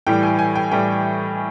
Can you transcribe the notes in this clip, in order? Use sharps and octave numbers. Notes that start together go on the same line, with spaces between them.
A2 E3 G3 G5
G#5
G#5
G5
A2 E3 G3 G5